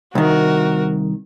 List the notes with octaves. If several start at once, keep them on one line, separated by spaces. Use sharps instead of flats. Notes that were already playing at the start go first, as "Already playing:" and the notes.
C2 D#3 F#4 A#4